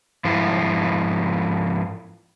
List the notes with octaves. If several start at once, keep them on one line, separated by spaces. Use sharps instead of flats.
G#2 F3 E4 F4